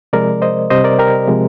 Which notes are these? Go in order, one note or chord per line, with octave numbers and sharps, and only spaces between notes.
C3 F3 G#3 A#4 D5
C5 D#5
C3 G3 C5 D#5
A#4 D5
G4 A#4
C3 F3 G#3